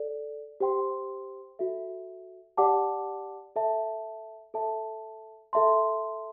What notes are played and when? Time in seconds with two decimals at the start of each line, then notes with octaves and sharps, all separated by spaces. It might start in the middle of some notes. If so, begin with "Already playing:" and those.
Already playing: A4 D5
0.60 G4 C5 G5 C6
1.59 F#4 A4 E5
2.57 G4 D5 F#5 A5 D6
3.56 A4 E5 A5
4.54 A4 E5 A5
5.53 A4 E5 A5 C6